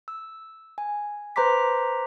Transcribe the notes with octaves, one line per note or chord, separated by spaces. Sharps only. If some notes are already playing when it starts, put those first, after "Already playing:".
E6
G#5
B4 C5 A#5 C6 D6 B6